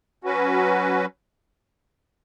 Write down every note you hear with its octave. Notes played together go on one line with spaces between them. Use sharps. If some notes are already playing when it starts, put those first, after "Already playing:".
F#3 C#4 F#4 B4